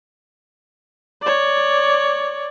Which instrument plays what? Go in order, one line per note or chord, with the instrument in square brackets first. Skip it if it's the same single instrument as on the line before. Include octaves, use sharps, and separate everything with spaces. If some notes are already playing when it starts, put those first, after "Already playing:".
[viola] C#5 D5